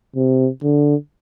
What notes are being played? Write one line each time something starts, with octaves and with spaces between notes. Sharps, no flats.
C3
D3